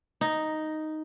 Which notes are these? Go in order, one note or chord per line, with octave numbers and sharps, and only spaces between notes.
D#4